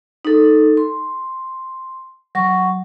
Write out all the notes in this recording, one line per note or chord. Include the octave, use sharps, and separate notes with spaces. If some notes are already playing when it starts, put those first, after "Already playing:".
D#4 A4
C6
F#3 C#6